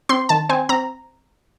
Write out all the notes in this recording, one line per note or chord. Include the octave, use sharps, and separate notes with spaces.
C4 C6
D#3 A5
C4 G#5
C4 A#5